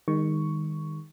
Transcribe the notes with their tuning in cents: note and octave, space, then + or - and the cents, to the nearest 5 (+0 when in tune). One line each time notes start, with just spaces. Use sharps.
D#3 +0 G#3 -40 C#6 +5